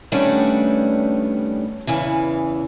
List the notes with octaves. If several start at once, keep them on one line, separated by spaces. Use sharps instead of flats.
D#3 G3 A3 B3 C#4 D4
E2 C#3 E3